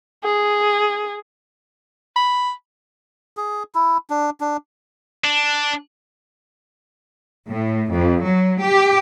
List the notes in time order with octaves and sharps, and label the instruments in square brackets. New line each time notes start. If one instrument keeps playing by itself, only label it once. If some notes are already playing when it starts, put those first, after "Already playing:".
[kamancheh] G#4
[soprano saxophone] B5
[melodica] G#4
E4
D4
D4
[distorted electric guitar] D4
[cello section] A2
F2
F#3
G4